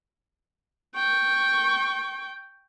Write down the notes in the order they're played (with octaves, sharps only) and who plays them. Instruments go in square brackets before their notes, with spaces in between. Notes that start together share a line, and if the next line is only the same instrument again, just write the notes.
[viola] G5 C#6